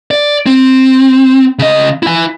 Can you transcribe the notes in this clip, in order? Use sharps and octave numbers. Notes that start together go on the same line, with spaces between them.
D5
C4
C#3 D#5
E4 G#5